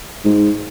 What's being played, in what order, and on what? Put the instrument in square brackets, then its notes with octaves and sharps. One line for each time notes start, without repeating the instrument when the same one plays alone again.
[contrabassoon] G#2